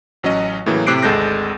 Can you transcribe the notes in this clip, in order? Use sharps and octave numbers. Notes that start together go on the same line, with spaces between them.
A1 F#3 C#4 D#5
A2 C#3 E3 F#3 A#3
A2 C3 D6 F#6 C7 D7
G#1 D2 G#3 A4 G6 A#6